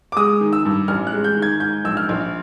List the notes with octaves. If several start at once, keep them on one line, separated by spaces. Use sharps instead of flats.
D6
G#3 D#6
D#3
E6
G2
A1 F6
F#6
G#3
G6
D#3
G#6
G#2 G6
A#1 E6
F6
A#1